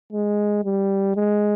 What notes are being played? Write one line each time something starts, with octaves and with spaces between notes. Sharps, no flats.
G#3
G3
G#3